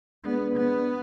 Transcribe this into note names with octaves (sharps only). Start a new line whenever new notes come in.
G#3 B3 D4 G#4 B4 D5
B3